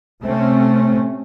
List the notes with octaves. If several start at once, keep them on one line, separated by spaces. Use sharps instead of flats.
C3 A3 C4 C#4